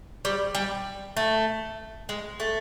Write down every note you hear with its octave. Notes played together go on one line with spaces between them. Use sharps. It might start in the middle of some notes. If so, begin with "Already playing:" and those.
G3
G3
A3
G#3
A3